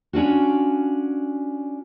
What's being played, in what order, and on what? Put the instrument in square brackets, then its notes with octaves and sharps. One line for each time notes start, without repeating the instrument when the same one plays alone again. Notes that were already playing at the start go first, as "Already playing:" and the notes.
[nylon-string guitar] C#4 D4 F4 F#4